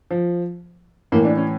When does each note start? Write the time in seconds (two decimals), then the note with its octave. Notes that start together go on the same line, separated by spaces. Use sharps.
0.11 F3
1.12 A2 E3 A#3
1.25 D4
1.37 C#4